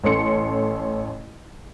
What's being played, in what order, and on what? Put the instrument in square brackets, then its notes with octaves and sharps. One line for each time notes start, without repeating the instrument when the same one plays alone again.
[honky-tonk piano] A1 C#4 A4 C6 C#7